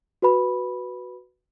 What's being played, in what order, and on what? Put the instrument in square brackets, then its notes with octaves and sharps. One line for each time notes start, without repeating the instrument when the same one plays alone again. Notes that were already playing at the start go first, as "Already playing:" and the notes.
[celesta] F#4 B4 B5